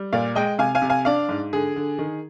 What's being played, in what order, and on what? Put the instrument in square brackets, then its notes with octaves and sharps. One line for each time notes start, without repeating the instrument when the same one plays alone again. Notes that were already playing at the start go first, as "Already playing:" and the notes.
Already playing: [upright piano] G3
A#2 D5 F5
G#3 D#5 G5
C3 F5 G#5
F5 G#5
C3
F5 G#5
D4 D5 F5
G#2
D3 G#4
D3
D#3